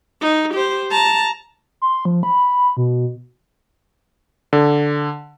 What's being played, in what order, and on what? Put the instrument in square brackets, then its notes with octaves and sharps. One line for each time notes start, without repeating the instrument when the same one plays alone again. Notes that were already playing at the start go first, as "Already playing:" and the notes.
[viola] D#4
G4 C5
A5 A#5
[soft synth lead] C6
F3
B5
B2
[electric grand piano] D3